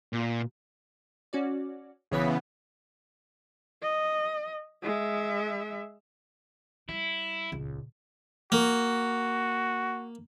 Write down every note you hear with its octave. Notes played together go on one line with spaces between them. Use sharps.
A#2
C#4 F#4 D5
B1 C#3 E3 B3 C#5 B6
D#5
G#3 E5
G3 E4
D#1 C#2
A#3 F#4